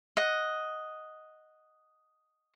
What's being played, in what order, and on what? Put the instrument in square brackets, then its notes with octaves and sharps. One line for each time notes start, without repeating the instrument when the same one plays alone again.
[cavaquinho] D#5 F#5